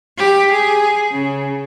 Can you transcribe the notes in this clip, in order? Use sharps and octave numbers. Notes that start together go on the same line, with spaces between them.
G4
G#4
C#3